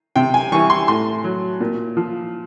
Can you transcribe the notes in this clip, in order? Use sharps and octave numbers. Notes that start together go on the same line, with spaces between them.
C3 G5
G#5
E3 G3 C#6
C6
A2 C6
F#3
A#2
F3